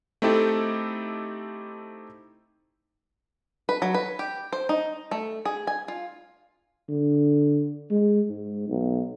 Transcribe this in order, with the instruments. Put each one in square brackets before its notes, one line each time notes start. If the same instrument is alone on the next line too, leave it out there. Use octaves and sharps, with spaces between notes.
[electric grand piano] A3 C4 D#4 E4 G4 A4
[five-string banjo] B4
F#3
B4
G4
C5
D#4
A3
G#4
G#5
F4
[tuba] D3
G#3
G#2
B1